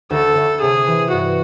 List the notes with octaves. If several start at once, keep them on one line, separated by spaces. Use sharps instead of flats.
D2 A4
D2
C3 G#4
E3
G2 F#4